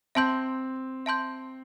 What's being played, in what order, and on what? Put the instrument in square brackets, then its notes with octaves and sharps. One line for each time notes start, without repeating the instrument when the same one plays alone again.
[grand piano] C4 [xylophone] E5 A5 C6 G6
[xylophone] E5 A5 C6 G6